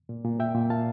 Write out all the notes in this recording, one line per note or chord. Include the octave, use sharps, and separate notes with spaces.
A#2
A#2
A#2 E5 G5
A#2
A#2 F5 A5